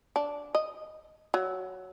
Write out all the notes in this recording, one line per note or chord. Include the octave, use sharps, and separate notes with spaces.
D4
D#5
F#3